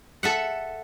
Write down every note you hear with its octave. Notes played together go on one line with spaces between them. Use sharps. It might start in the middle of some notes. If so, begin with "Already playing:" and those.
A4 E5 F#5